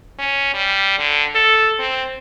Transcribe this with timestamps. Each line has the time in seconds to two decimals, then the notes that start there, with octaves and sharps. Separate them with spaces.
0.19 C#4
0.54 G3
0.99 D3
1.35 A4
1.80 C4